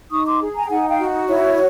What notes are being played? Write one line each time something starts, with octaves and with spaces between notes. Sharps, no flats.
D#4 C#6 D#6
C6 D6
G#4
G#5 A#5
G5
D#4 F#5 G#5
F5 G5
F#4
E4 C#5